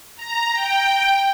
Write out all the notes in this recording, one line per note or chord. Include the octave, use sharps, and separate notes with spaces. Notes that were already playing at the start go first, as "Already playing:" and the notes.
A#5
G5